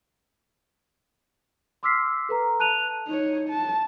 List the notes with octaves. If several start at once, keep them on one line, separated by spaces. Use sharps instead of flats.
C6 D6 E6 F6 B6 C7
A4 B4 A#5
A5 F#6 D#7 F7
D#4 C#5
A5